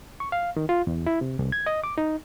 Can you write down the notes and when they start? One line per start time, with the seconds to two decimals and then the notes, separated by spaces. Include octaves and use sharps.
0.20 C#6
0.32 F5
0.57 D#3
0.69 F4
0.87 E2
1.07 E4
1.21 C3
1.39 C2
1.52 G#6
1.66 D#5
1.84 D6
1.98 D#4